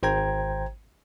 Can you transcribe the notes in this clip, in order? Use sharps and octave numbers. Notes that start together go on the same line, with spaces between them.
G#1 C5 G5 A#5 G#6